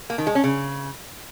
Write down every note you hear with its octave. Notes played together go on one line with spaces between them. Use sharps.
A#3
D#3
G#3
C#4
C#3